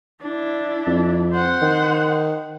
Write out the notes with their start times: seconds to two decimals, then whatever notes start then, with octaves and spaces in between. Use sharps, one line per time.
0.22 D4 E4
0.87 F2
1.33 C5 F#5
1.62 D#3